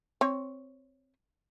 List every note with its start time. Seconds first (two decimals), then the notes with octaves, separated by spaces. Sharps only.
0.21 C4 C#5